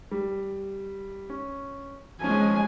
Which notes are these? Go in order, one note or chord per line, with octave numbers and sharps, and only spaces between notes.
G3
C#4
F3 G#3 C#4 G#5